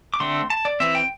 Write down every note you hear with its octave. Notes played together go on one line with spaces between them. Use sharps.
D6
D3 A3 C4 C6
A5
D5
E3 C4 E5
G5